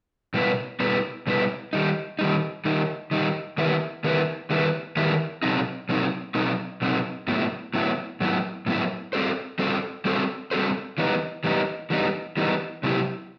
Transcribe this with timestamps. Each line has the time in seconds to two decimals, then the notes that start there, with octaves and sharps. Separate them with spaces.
0.34 B2 G3 B3 E4 B4
0.80 B2 G3 B3 E4 B4
1.27 B2 G3 B3 E4 B4
1.73 D#3 G3 D#4
2.19 D#3 G3 D#4
2.65 D#3 G3 D#4
3.11 D#3 G3 D#4
3.58 D#3 G3 B3 E4 B4
4.04 D#3 G3 B3 E4 B4
4.50 D#3 G3 B3 E4 B4
4.96 D#3 G3 B3 E4 B4
5.43 B2 F#3 C4 D#4
5.89 B2 F#3 C4 D#4
6.35 B2 F#3 C4 D#4
6.81 B2 F#3 C4 D#4
7.28 A2 F#3 B3 E4
7.74 A2 F#3 B3 E4
8.20 A2 F#3 B3 E4
8.66 A2 F#3 B3 E4
9.13 G3 C4 F#4 A4 C5
9.59 G3 C4 F#4 A4 C5
10.05 G3 C4 F#4 A4 C5
10.51 G3 C4 F#4 A4 C5
10.98 E3 G3 B3 D#4
11.44 E3 G3 B3 D#4
11.90 E3 G3 B3 D#4
12.37 E3 G3 B3 D#4
12.83 C3 F#3 B3 E4 G4